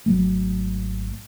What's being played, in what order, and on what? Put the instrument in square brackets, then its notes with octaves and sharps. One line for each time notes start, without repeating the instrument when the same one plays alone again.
[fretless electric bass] G#1 F#3 A3